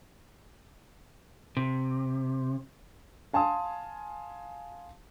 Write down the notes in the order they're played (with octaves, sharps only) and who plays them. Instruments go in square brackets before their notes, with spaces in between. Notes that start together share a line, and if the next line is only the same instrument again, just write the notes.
[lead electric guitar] C3
[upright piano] F5 G#5 A5 C6 D#6